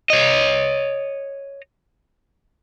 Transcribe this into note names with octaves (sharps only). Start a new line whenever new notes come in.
C#5 D#5